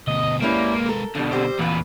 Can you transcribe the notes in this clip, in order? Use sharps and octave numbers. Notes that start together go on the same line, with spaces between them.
D2 B2 D#5
G3 G#3 A#3 C#4 E4 B4
A4 A#4
B2 D3 F3 G3 D4
G3 C4 G4 C5
E2 A#2 F3 F4 B4